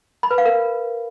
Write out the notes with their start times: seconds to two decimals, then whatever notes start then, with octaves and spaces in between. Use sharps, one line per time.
0.23 B5
0.31 B4
0.38 F5
0.45 A#4